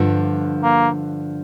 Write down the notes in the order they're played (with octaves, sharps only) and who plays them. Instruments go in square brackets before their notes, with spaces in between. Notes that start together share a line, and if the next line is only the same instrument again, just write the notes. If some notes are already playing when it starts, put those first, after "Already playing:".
Already playing: [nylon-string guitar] G2 D3 F3
[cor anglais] A#3